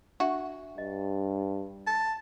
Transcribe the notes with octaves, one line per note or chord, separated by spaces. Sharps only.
D4 F#4 E5 C#6
G2 D#5
A5